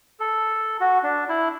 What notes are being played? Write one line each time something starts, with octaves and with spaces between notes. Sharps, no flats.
A4
F#4
D4
E4